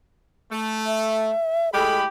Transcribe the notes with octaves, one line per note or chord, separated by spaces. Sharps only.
A3
E5
A2 G#3 G4 A4 B5